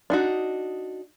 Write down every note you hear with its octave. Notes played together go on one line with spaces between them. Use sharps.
D4 D#4 F#4